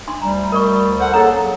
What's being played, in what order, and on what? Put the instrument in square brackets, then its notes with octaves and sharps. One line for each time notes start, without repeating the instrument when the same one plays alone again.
[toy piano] D4 C6
[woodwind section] D2 G3 [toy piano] A#5
[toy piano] A#4 D5 C#6
[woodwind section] A4 C5 F#5
[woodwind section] A#3 G#4 A4 [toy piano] C#4 C#5 A#5
[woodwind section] F#3